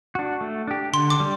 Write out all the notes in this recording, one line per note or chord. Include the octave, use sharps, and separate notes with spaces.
D4 F#4
A3
D4 G4
D3 C6
D6
G3